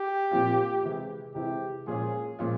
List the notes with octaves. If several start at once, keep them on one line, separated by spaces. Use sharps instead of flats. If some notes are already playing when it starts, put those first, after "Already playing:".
Already playing: G4
A#2 F3 C4 F4
C3 E3 G#3 E4
C3 E3 G#3 E4 G4
A#2 F3 G#3 C#4 F4 G#4
A#2 F3 G#3 C#4 F4